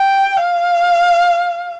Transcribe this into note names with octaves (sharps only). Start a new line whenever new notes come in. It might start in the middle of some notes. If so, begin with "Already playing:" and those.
Already playing: G5
F5